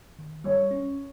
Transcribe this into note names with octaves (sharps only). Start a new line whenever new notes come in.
D#3
G3 C#5
C#4